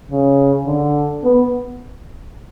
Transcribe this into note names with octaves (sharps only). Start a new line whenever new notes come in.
C#3
D3
B3